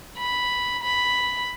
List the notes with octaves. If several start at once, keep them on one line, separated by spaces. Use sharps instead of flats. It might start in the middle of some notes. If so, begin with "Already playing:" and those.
B5
B5